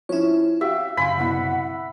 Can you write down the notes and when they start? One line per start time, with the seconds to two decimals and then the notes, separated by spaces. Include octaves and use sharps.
0.09 F3 C#4 E4 C#5
0.61 F#4 G4 E5 F5
0.97 F#2 C#3 F5 G#5 B5 C6
1.17 C2 B2 F#5